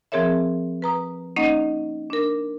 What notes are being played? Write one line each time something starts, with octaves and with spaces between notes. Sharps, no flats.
F3 C4 G#4 A#4 C#5 E5
B4 A#5 D#6
A#3 C#4 D#4 D#5 F#5
D4 A#4